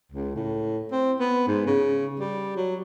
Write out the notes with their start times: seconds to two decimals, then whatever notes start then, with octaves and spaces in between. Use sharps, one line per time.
0.12 C#2
0.36 A2
0.92 C4
1.20 B3
1.48 G#2
1.67 C#3
2.20 G3
2.56 F#3